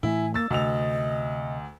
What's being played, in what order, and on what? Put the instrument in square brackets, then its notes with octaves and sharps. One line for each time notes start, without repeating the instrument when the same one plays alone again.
[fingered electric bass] A2 E3 A3 [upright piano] E4 [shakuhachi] G#5
[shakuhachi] A#3 [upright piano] E6 A6
[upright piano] D2 E6 F7 [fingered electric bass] C3 [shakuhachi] D#5